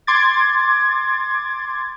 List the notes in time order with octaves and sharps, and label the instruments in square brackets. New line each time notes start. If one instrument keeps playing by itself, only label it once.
[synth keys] C6 D6 G#6 A6